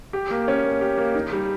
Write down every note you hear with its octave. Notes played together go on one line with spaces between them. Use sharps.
G4
A#3
C#4
A#3
G4
A#3
D#4
G3